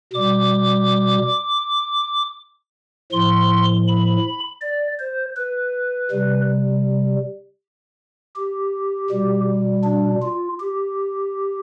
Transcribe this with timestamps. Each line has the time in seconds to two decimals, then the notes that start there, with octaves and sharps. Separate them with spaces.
0.14 B2 G3 D6
3.12 A2 F3 C6
3.88 B5
4.62 D5
4.99 C5
5.36 B4
6.11 C3 G3
8.36 G4
9.10 B2 G3
9.84 D4
10.22 F4
10.60 G4